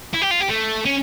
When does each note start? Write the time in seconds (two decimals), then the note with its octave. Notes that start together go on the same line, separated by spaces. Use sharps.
0.13 E4
0.21 G4
0.31 F4
0.40 G4
0.49 A3
0.85 C#4